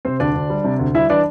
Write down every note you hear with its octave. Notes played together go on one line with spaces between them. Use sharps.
C3 C4 C5
D2 D4 D5
D2
G3
C3
D2
G3 E4 E5
E3 D4 D5